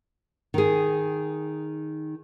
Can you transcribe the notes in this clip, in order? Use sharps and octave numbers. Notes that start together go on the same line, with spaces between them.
D#3 G#4